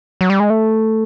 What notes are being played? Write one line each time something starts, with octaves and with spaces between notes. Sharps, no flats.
F#3
G3
G#3
A3